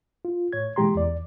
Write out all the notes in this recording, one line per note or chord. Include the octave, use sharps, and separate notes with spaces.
F4
A2 C#5 G#6
A#2 E3 G#3 G4 A#5 C6
E2 D5